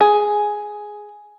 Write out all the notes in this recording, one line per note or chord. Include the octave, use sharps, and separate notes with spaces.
G#4